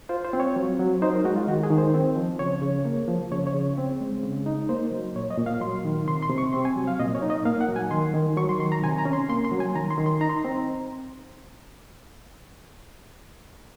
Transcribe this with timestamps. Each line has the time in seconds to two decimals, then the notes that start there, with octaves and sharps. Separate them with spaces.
0.09 F4 C5
0.25 C5
0.33 C4
0.40 C#5
0.56 F#3
0.79 F#3
1.02 D#4 C5
1.14 A#4
1.24 G#3 F#4
1.36 F4
1.47 D#3 F#4
1.63 G#4
1.70 D#3
1.78 C5
1.94 C4
2.16 F3
2.39 C#3 C#5
2.62 C#3
2.85 A#3
3.08 F3
3.31 C#3 C#5
3.47 C#5
3.55 C#3
3.77 C4
4.01 G#3
4.23 C#3
4.46 D#4
4.69 A#3 C5
4.92 F#3
5.15 A#2 C#5
5.30 D#5
5.38 A#2
5.46 F5
5.61 F#3 C6
5.85 D#3
6.07 C3 C6
6.23 C6
6.30 C3
6.38 C#6
6.53 C4 C6
6.65 G#5
6.76 F#3
6.87 F5
6.99 A#2 D#5
7.15 C#5
7.22 D#4
7.30 D#5
7.45 A#3 F5
7.61 F#5
7.69 F#3
7.76 G#5
7.91 D#3 C6
8.14 D#3
8.37 F#3 C#6
8.49 C6
8.59 D#3 C6
8.72 A#5
8.83 C3 G#5
8.98 A#5
9.05 C#4
9.13 C6
9.29 A#3 C6
9.45 C6
9.52 F#3
9.60 G#5
9.75 D#3 A#5
9.90 C6
9.98 D#3
10.06 C6
10.21 D#4 A#5
10.30 C6
10.37 A#5
10.44 C4